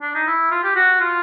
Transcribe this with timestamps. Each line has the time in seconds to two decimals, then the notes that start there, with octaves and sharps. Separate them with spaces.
0.02 D4
0.15 D#4
0.27 E4
0.51 F4
0.64 G4
0.75 F#4
1.00 F4